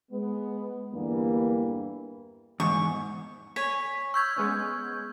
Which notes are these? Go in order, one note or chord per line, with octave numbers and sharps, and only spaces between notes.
G#3 B3
E2 G2 D3 E3 G3 A#3
E2 G#2 C#6
C#5 G#5 B6
C#6 E6 F6 G6 G#6
G#3 B3 C#4